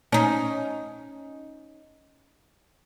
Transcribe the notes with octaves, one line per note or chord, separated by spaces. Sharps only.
C#4 D#4